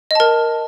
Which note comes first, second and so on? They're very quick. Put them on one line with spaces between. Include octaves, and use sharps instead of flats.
D#5 A5 A#4